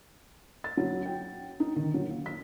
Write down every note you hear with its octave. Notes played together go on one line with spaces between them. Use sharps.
A6
F#3
G5
D#4
D#3
F#3
A#3
B6